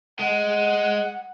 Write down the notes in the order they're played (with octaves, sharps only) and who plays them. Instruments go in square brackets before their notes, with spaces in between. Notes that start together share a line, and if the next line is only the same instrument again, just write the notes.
[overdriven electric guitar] G#3 [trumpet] F#5